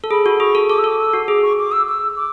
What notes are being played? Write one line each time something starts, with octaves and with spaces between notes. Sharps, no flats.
A4
G#4 B5
F#4
G#4 C#6
A4
A4 D6
E6
A4
D6
E6
F#4
G#4 D6
C#6
D6
E6
E6
D6